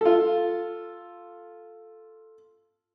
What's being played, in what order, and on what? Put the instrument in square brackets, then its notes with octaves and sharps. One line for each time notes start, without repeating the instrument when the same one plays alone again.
[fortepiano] F4 A4